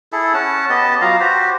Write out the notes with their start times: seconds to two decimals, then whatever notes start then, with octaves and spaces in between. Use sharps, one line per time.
0.12 E4 G#4 A4
0.34 C#4 F#5 A5
0.70 B3 G4 D#5 A5
1.01 F#3 F4 F5 A#5
1.20 F#4 G4 C5